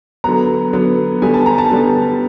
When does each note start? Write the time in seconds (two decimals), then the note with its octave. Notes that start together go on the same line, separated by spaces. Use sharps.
0.24 D3 F#3 B3 A#5
0.73 D3 F#3 B3
1.22 D3 G3 B3 G#5
1.34 A5
1.46 A#5
1.58 A5
1.70 D3 G3 B3